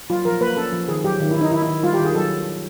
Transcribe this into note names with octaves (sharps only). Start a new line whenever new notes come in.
F#3 F4
F3 A#4
A#3 B4
C#4 A4
F3
D#3 G#4
F#3 G4
D#3
E4
D#3
D#4
D#3 E4
E4
D#3
G3 F4
G4
D#3
G#4
F#3 A4